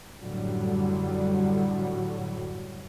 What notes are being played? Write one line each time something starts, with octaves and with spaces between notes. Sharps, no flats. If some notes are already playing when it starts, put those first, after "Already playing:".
F#2 A2 D3 F#3 G3